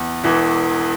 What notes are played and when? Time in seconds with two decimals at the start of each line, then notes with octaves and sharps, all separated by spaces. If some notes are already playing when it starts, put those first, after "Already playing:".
Already playing: E2
0.24 E1 E2 E3